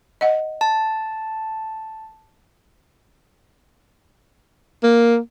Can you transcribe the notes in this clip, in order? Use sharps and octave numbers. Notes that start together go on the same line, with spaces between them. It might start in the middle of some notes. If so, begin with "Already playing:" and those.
D#5 F#5
A5
A#3